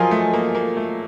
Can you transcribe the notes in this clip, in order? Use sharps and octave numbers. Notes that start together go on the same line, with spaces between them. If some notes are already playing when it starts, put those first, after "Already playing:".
Already playing: F3 F#3 F4 A#4 D#5 G#5
A3
A#3
A#3
A3